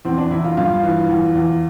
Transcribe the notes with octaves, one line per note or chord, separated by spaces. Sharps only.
E2 C4
D4
E2 E4
F4
G2 F4
E3
E2
E2